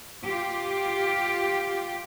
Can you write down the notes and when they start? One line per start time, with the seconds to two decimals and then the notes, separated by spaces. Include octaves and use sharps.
0.25 F4 G4